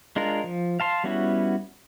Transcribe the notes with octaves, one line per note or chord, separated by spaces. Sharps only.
G#3 D4 F4 A#4
F3
F5 A5 C6
G3 B3 C#4 E4 F#4